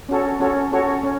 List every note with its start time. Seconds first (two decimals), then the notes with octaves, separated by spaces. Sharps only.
0.09 C#4 F#4 A4 C#5
0.40 C#4 F#4 A4 C#5
0.72 C#4 F#4 A4 C#5
1.03 C#4